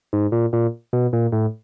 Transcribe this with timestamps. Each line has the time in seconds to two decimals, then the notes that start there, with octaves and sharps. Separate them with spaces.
0.13 G#2
0.32 A#2
0.53 A#2
0.93 B2
1.13 A#2
1.32 A2